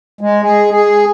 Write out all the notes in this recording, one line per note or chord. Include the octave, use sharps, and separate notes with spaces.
G#3
G#4
G#4